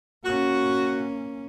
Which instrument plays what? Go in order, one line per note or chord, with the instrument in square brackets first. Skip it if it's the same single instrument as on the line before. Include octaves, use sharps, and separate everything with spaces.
[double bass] A#3 C#4 [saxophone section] F#4